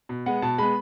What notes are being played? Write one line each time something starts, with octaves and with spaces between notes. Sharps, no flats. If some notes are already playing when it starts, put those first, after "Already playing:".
B2
G#3 B3 F#5
B2 A5
G#3 B3 B5